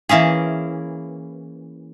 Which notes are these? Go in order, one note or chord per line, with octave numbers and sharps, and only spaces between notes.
E3 A#3 C#4 G#4